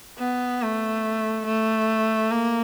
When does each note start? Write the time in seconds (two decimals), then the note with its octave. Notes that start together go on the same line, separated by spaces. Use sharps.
0.19 B3
0.62 A3
1.46 A3
2.31 A#3